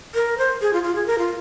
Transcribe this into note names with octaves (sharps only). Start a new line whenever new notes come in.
A#4
C5
G#4
F4
F4
G#4
A#4
F4